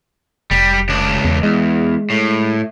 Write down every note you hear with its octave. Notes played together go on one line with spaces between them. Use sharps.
F1 G3
C#2 D4
E2
E2 G#3
A2